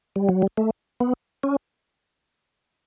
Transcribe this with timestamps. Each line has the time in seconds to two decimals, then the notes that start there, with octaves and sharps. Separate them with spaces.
0.16 G3
0.29 F#3
0.42 G3
0.58 A3
1.00 B3
1.43 C#4